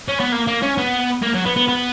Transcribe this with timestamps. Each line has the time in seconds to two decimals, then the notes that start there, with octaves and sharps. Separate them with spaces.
0.08 C#4
0.20 B3
0.32 A#3
0.47 A#3
0.62 C#4
0.78 B3
1.22 A#3
1.34 F#3
1.45 B3
1.56 B3
1.68 B3